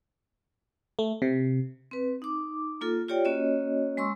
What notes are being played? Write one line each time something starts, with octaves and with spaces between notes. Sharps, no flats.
A3
C3
C4 B4
D#4 D6
A#3 F4 A4
F4 G4 C#5 D5 G5
A#3 C#4 F#4 C#5 D#5
G#3 C6 C#6 E6